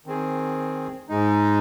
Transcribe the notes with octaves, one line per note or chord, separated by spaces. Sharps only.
D#3 C4 G#4
G#2 G#3 D#4